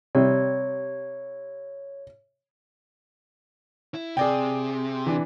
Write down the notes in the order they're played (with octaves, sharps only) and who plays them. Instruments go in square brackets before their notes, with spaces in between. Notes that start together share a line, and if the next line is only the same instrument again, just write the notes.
[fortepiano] C3 G3 [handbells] C#5
[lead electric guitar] E4
[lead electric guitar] C3 [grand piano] G#4 D5 G5
[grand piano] E3 D4